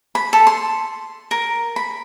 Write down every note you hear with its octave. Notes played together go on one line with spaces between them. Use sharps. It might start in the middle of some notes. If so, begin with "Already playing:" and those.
B5
A4
C6
A#4
B5